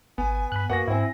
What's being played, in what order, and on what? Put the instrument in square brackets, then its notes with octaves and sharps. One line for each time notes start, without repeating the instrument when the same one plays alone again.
[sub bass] G#1 [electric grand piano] B3 [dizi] G#5
[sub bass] G2 [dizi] G#5 [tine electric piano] B5 F#6
[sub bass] F#2 [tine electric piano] A#3 B3 F#4 [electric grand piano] F#5 A#6
[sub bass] G#2 [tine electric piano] C4 E4